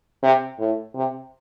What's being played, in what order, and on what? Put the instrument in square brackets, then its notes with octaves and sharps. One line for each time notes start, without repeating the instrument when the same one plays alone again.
[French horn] C3
A2
C3